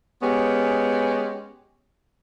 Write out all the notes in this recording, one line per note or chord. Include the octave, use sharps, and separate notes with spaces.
G#3 B3 C#4 G4